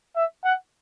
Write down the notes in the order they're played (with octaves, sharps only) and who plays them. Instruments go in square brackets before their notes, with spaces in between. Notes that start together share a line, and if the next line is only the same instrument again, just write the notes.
[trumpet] E5
F#5